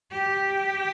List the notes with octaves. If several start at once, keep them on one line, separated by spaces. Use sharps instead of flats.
G4